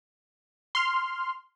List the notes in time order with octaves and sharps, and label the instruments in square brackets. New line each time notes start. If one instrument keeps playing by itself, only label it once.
[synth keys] C6 F6